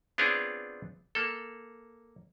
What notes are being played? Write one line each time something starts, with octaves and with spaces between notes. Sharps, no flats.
B3 C4 D4 F4 G#4 C#5
A#3 A4